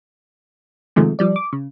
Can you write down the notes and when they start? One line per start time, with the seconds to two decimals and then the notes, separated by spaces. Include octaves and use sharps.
0.96 G#2 C3 D#3 F3 G#3 A3
1.19 F3 G3 D5
1.36 D6
1.53 C#3